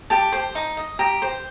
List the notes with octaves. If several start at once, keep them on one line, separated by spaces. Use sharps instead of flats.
G4 A5
C5
D#4
D#5
G4 A#5
C5